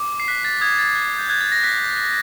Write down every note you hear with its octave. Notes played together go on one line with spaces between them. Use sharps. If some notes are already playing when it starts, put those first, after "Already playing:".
Already playing: D6
C7
F#6 B6
A6
D#6 G#6
A6
F#6
G6
F#6 G#6
A6
A#6
F#6 B6
F#6